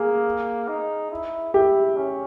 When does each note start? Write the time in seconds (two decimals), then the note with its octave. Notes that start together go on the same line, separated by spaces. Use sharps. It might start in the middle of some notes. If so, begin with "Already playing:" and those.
Already playing: A#3 G#4
0.68 D#4
1.11 E4
1.54 E4 G4
1.96 C#4